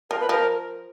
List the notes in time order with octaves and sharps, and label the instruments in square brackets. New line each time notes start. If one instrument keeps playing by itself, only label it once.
[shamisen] F3 [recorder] A#4
[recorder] B4
[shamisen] F3 [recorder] A#4